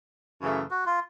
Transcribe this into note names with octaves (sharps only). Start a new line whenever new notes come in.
F#2 C#3 E3 A3
F#4
F4